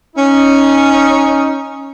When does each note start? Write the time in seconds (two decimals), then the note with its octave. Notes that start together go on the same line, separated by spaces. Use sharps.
0.16 C#4 D#4